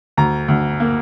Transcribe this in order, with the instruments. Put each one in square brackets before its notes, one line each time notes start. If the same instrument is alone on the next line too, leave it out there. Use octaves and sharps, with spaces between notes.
[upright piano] D2 A#5
D2
A#3